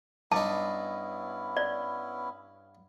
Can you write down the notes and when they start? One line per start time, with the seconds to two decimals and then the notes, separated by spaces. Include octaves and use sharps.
0.32 G2 B3 C#4 D#4 E4 A5
1.57 D5